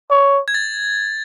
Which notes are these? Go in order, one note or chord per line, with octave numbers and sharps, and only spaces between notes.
C#5
G#6
A6